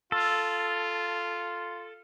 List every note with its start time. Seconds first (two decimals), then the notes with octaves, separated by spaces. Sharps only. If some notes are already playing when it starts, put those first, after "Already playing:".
0.12 F4 A4